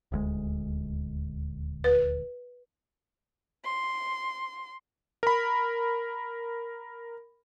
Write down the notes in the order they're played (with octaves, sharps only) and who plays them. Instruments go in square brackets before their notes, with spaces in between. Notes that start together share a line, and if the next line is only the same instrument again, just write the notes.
[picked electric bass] D#1 D2 G#3
[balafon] B4
[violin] C6
[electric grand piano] A#4 B5